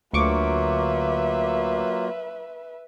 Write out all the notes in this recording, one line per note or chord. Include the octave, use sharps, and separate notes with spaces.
D2 F#3 A#3 F4 B4 E5 C#6 D6